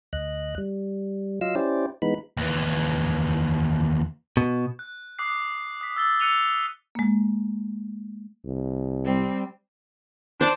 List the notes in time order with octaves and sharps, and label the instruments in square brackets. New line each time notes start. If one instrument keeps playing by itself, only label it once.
[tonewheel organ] D2 D#5 F#6
G3
F#3 F4 D#5 F5 E6
C#4 E4 G4 C5 D5
E3 G#3 B3 D#4 B5
[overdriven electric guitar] D#2 E3
[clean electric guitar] B2
[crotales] F#6
D6 D#6 F#6 C7
D#6 B6
E6 A6 G7
E6 F#6 C#7 D#7 F7 G7
[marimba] G#3 A#3
[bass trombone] C2
[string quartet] G3 C4
[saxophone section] D4 [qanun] C5 A5